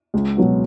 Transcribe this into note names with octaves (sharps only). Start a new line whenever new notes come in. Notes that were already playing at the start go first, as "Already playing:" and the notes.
C#2
B2 F#3 B3 F#4